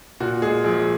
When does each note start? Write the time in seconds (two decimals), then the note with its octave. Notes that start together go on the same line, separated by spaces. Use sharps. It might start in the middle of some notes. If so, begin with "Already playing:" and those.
0.20 A#2 F#4
0.42 G#3 G#4
0.64 A#1